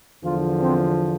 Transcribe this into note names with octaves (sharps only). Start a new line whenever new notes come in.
E2 D3 F3 F4
C4